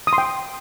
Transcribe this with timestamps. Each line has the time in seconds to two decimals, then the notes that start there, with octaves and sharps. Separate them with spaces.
0.07 D#6
0.13 C6
0.18 G5